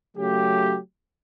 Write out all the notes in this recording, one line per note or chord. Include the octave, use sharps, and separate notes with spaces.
C#3 F#3 A3 G4